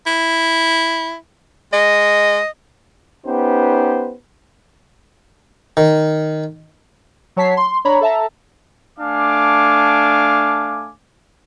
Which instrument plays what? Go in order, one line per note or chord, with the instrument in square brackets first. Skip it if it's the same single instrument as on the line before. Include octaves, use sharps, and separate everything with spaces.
[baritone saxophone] E4
[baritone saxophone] G#3 [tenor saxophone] D#5
[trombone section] B3 C#4 D#4 G4 B4 C5
[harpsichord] D#3
[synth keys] F#3 C#5 A5 B6 C7
C6
D4 C#5 A#5 B5
A4 E5 A5 A#5
[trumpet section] A3 D4 F5 G#5 D6